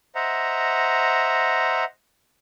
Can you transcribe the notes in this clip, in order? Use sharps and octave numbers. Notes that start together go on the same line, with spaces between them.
C5 D#5 E5 F#5 A#5